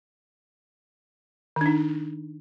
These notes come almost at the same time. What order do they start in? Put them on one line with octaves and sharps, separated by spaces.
D#3 D4 D#4